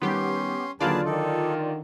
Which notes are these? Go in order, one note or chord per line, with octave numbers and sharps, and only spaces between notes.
D#3 G3 B3 C#4 G4 C6
D#2 D3 F#3 F4 G#4 B4 D5 A5
D#3 D#4 A4